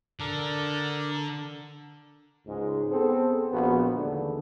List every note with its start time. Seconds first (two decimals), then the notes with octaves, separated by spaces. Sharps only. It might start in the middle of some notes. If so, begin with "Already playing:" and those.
0.20 D3 A4 A#4 D5
2.47 C#2 G#2 G#3
2.89 B3 C4 G#4 A4
3.50 A#1 B3 F4 F#4
3.96 D#2 D3 E3 G#3